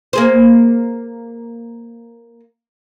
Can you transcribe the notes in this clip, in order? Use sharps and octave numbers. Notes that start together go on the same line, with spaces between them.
A#3 G#4 C5